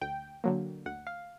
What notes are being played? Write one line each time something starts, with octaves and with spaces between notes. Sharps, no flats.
D2 G5
D3 F#3 A#3
D2 F#5
F5